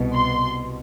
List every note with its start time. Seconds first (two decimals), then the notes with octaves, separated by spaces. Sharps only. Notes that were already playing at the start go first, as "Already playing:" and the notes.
Already playing: C2 B2
0.14 C6